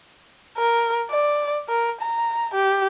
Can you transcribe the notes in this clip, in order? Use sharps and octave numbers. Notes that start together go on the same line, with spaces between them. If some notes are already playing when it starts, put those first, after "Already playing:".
A#4
D5
A#4
A#5
G4